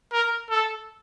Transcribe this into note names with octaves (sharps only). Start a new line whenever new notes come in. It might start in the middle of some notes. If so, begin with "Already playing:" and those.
A#4
A4